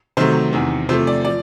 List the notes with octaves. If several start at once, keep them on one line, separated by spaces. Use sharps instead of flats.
C3 D#3 F#3 A3 C5
E2 C3 D#3
C3 F3 A3 C5
D5
F3 D5